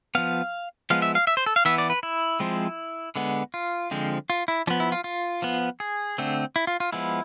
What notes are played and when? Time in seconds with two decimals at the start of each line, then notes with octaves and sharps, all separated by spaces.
0.15 F3 B3 F5
0.90 F3 G#3 B3 F5
1.02 E5
1.15 F5
1.27 E5
1.37 C5
1.46 A4
1.56 F5
1.65 E3 B3 E5
1.78 D5
1.90 B4
2.03 E4
2.40 F3 G#3 C4
3.16 D3 G#3 B3
3.54 F4
3.91 D3 F3 G#3 C4
4.30 F4
4.48 E4
4.67 F3 D4
4.70 B3
4.80 E4
4.92 F4
5.04 F4
5.42 F3 B3
5.80 G#4
6.18 D3 A3 C4
6.56 E4
6.67 F4
6.80 F4
6.93 F3 G#3 B3 E4